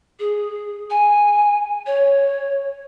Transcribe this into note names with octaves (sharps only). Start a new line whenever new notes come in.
G#4
G#5
C#5